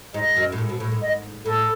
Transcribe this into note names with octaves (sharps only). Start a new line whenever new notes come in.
G#2 D#5
F#2
A2
G#2
B2
A2
G#2
D#5
A2 A4